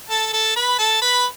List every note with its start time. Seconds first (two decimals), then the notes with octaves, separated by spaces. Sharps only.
0.10 A4 A5
0.33 A4 A5
0.56 B4 B5
0.78 A4 A5
1.02 B4 B5